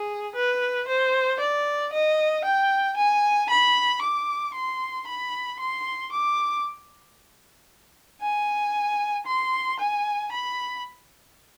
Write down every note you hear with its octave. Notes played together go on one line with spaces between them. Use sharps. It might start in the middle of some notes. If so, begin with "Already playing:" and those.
Already playing: G#4
B4
C5
D5
D#5
G5
G#5
B5
D6
C6
B5
C6
D6
G#5
C6
G#5
B5